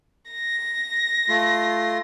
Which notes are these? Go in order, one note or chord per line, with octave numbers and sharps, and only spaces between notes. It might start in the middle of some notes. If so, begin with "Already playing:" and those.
A#6
A3 F4 C6